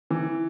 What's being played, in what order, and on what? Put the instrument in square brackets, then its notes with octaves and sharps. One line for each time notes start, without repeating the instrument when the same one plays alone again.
[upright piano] E3